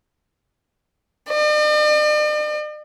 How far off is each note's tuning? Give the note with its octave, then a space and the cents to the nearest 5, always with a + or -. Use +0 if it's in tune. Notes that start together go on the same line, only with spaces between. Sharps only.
D5 +45